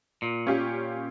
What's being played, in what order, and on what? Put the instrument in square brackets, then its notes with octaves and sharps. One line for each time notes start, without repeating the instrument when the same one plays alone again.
[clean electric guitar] A#2
[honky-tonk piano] C#4 F4 G4